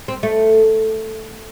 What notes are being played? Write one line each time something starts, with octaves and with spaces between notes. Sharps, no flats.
C4
A3